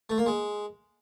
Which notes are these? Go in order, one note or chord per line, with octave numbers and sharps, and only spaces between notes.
A3
A#3
G#3